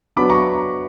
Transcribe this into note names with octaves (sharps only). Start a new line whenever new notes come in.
F#3 B3 D4 B5 D6
A#5 C#6